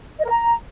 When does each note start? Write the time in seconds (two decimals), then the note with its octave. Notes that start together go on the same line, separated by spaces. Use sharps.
0.19 D#5
0.24 A#4
0.29 A#5